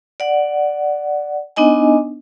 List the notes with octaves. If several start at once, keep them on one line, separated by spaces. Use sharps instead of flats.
D5 F#5
B3 D4 D#4 D#5 G#5